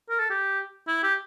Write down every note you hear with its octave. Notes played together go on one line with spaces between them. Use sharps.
A#4
A4
G4
E4
G4